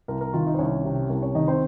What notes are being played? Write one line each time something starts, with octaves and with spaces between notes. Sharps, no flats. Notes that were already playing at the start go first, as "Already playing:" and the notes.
C2 A#4
A#4
D#3 F4 F5
D#4 D#5
C5
C2 C#4 C#5
C3
C2 A#4
C#4 C#5
D#3 D#4 D#5
C4 C5